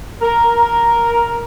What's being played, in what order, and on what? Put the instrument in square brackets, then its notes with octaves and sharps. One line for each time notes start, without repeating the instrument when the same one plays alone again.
[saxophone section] A#4